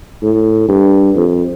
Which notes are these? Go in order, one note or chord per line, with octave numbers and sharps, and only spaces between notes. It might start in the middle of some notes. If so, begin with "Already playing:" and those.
A2
G2
F2